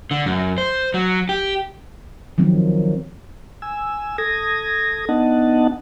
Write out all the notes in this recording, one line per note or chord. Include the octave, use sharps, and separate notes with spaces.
D3
F#2
C5
F#3
G4
D#3 F3 F#3 C4
G#5 E6
A4 D#6 G#6 A#6
B3 D4 D#4 D#5 F#5 A5